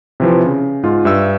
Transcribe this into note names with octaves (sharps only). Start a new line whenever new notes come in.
C3 E3 F3
C#3
G#2 F4
G2 E5 E6